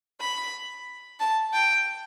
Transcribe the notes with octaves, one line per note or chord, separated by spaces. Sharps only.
B5
A5
G5